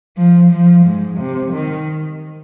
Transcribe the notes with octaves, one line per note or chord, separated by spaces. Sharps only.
F3
F3
G#2
C3
D#3